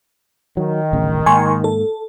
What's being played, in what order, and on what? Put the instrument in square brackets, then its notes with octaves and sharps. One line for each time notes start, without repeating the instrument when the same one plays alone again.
[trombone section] D#3 [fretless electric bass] F#3
[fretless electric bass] D1 A1 C#3
[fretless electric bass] G#2 A#3 [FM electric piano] G#5 C6 C#6
[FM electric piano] A4